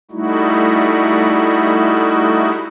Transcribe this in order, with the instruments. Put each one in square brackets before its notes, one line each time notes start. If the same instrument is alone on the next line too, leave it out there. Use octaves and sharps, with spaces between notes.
[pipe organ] G3 A3 D#4 E4 F#4